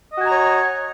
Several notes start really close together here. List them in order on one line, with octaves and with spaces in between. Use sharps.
D#5 F#4 G#5 A#5 C#5